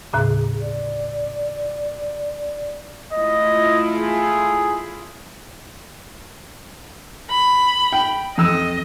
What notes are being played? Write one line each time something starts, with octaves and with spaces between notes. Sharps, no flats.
D#2 A2 C#3 G#4
D5
A3 E4 F4 D#5
G#4
B5
G5
F2 D#5 E6